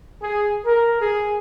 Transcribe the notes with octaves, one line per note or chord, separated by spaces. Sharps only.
G#4
A#4
G#4